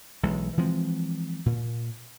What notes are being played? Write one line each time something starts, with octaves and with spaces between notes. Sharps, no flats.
B1 E3 G#3
E3 F3 G#3 C4
A#2